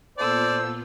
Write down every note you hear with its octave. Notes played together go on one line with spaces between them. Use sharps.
A#2 B3 F4 A4 C5 D5 E6